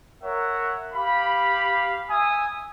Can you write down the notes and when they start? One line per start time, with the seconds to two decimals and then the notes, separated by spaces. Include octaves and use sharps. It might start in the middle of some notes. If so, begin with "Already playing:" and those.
0.23 A#4 C#5 E5 F#5
0.94 G4 F5 B5
2.10 E5 G#5 D#6